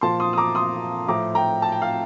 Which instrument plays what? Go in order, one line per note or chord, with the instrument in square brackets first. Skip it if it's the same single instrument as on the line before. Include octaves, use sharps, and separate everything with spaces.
[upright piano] A#2 F3 A5 C6
C6 D#6
D#6
A#5 D6
C6 D#6
A2 F3 A#5 D6
G5 A#5
A5
G5
F5